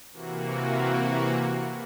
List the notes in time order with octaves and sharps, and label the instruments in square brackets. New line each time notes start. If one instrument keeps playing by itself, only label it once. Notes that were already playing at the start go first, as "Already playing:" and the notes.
[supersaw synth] C3 E3 A#3 F#4